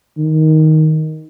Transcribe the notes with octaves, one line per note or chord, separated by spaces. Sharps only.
D#3